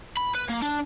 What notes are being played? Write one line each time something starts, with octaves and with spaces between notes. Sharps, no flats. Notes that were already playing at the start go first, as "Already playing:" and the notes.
B5
B4
A#3
D4